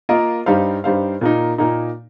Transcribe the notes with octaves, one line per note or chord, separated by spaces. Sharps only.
A#3 F4 A#4 D#5
G2 G3 D#4 C5 F5
G2 G3 D#4 C5 F5
A#2 A#3 D#4
A#2 A#3 D#4